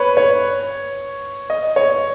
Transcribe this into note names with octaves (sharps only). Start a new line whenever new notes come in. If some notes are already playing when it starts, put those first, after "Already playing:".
Already playing: B4 C#5
C#5
D#5
C#5